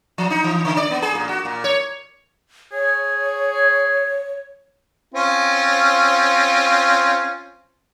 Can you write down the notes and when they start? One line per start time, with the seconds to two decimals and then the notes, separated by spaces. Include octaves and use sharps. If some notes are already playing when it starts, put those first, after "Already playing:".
0.18 F3
0.30 D#4
0.44 E3
0.65 D3
0.77 D5
0.91 B3
1.02 G#4
1.15 A#2
1.29 F#4
1.45 A#2
1.64 C#5
2.72 G#4 C#5
5.14 C4 C#4 F4